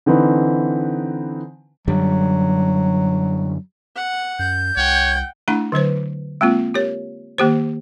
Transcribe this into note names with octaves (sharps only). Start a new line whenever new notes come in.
D3 E3 C4 D#4 B4
F#2 D3 F#3 G3
F#5
F#2 G6
C2 C#5 F#5 G5
A3 D4 E4 F#5 A#5
D3 F#3 B4 C5
G#3 A#3 C4 F4
G4 A#4 C#5
D#3 A#3 G4 C5